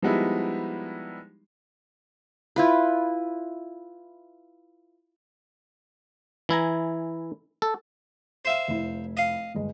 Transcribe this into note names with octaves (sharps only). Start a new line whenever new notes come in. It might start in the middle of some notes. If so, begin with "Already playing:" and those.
F3 G3 G#3 B3 D#4 E4
E4 F4 B4
E3 E4 G#5 A#5
A4
C5 E5 F5
F1 E4
D#5 F5
G1 G#3